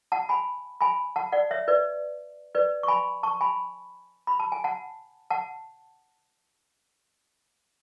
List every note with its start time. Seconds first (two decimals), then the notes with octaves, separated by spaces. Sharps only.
0.12 F#5 A5
0.29 G#5 B5
0.81 G#5 B5
1.16 F#5 A5
1.32 D5 F#5
1.51 C#5 E5
1.68 B4 D5
2.55 B4 D5
2.83 C#6
2.88 G#5 B5
3.23 A5 C#6
3.41 G#5 B5
4.27 B5
4.40 A5
4.52 G#5
4.64 F#5 A5
5.30 F#5 A5